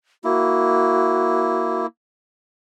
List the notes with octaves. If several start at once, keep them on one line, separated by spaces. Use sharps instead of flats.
A#3 E4 F#4